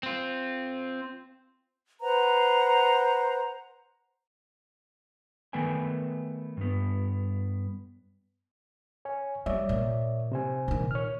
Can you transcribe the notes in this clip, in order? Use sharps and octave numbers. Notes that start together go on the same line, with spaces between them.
C4 F4
B4 C5 F#5 A#5
D#3 A3 B3 B4 G5 G#5
G2 B3
C#5 G#5
G3 C#5 D5 E5
A#2
C3 C5 G#5
A#2 D#3
C#5 F6